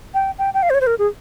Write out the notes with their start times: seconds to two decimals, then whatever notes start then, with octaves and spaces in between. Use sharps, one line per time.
0.14 G5
0.38 G5
0.54 G5
0.63 F5
0.70 C5
0.74 C#5
0.81 C5
0.87 A#4
0.99 G#4